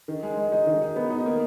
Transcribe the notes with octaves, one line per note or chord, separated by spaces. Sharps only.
D#3
G#3
G#3
D#4
D#3
D#4
B3
D#4
A#3